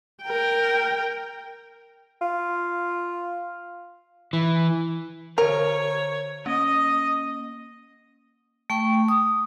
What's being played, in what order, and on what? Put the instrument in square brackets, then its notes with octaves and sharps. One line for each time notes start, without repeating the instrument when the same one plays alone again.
[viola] A#4 G5
[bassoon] F4
[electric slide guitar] E3
[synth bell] D3 C5 [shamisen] A#4 [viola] C#5
[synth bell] A#3 C#4 [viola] D#5
[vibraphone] A3 G5 C#6
D#6